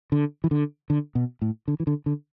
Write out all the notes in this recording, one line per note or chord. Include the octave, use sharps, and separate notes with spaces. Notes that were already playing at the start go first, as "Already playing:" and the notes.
D3
E3
D3
D3
B2
A2
D3
E3
D3
D3